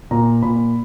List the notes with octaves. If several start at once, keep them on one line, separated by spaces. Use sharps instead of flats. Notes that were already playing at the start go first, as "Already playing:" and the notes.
A#2 A#5
A#2 B5